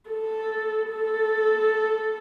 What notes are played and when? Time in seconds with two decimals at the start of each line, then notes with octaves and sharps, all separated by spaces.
0.10 A4
0.91 A4